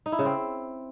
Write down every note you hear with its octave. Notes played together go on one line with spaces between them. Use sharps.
D#4
E4
C#3
C4